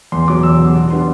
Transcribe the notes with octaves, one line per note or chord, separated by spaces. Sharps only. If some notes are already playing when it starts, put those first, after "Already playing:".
E2 C6
B2 F#3 D6
E2 E6
B2 F#3
B2
G3 B3 D4 C6